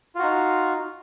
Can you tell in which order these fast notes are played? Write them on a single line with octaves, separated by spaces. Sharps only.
F4 F#4 D#4